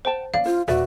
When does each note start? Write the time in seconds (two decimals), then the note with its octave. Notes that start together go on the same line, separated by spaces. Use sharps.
0.05 C5 F#5 G5 A5
0.34 A#3 C#4 D5 F5
0.46 F4 C5
0.68 D#1 F#4 B4 D5 E5